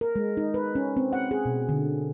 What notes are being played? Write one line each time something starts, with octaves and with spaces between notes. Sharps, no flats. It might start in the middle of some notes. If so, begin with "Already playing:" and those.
A#4
G#3
D#4
B4
C#4
C4
F#5
G#4
B2
D3